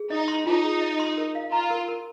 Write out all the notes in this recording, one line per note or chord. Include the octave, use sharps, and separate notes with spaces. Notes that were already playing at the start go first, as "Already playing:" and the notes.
Already playing: G#4
D#4 D#5
C6
D#4 F4
G#4
D#5
C6
A#4
F5
F4 A#5
A#4
A#4